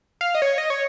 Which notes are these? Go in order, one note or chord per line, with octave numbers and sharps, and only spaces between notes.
F5
D#5
C#5
D#5
C#5